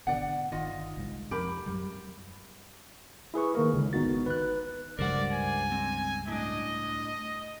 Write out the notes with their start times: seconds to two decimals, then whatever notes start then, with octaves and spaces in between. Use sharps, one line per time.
0.07 G#1 B2 D3 D5 F#5
0.52 G1 D#3 F4 D#5
0.97 C2 G#2
1.31 F2 G4 A#4 B5
1.66 F#2 F#3 G3
3.34 E4 G#4 B4 C#6
3.55 D#3 A#3 A#4
3.73 C#2 D3
3.93 G#1 B3 D#4 F#4 A6
4.26 B4 F#6
4.99 C#2 G2 G3 A#4 C5 D5 F#5
5.32 G#5
5.72 C4
6.28 A2 D4 D#5